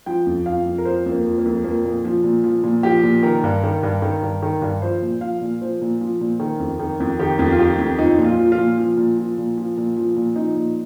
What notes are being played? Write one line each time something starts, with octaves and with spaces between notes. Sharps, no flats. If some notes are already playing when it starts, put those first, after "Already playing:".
F3 G5
F2
F3 F5
F2
A#4
F3 C5
F2
A#3
F3
A#3
F2
F3 A#3
A#2
F3
A#2
F3
A#2
F3 G4
A#2
D#3 A#4
G2
D#3
G2
D#3
G2
D#3
G2
F3 C5
A#2
F3 F5
A#2
F3 C5
A#2
F3
A#2
D#3
F2
D#3
F2
D#3 G4
F2
F4
D#3 G4
F2
F3 D#4
A#2
F4
F3
F4
A#2
F3
A#2
F3
A#2
F3
A#2
F3
A#2
F3 D#4
A#2